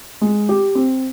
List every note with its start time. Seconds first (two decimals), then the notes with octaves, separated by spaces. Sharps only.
0.22 G#3
0.49 G4
0.75 C4